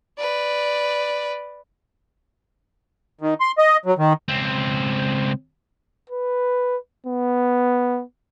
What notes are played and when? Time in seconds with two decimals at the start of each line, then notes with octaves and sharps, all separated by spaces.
0.18 B4 D5
3.21 D#3
3.41 C6
3.58 D#5
3.86 F#3
3.98 D#3
4.28 C#2 C4
6.10 B4
7.07 B3